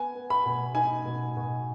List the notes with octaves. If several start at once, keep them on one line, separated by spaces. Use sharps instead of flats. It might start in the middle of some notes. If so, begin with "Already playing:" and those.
Already playing: B3 G#5
B3
B5
B2
D#4 G#5
B2
B2